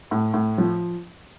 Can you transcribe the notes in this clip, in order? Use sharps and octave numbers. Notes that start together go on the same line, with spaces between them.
A2
A2
F3